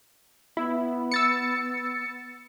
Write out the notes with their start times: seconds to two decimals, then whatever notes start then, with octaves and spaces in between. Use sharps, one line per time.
0.57 B3 E4
1.11 E6 A6 C#7